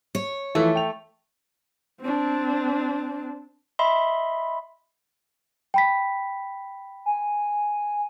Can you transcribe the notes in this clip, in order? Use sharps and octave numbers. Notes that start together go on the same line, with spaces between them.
C#5
E3 F3 A3 E4
G5 F7
C4 D4
D#5 E5 B5 C6
G5 B5 B6
G#5